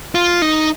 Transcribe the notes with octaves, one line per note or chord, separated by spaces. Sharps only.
F4
D#4